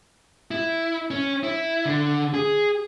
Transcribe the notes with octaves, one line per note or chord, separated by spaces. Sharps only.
E4
C#4
E4
D3
G#4